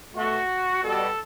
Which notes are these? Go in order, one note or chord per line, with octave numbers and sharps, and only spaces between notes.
B2 A3 F#4
B2 G3 A4